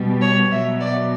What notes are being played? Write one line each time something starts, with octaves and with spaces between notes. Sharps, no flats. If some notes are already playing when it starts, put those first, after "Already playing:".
Already playing: B2 G3
C#5
B2 E5
F#3
D5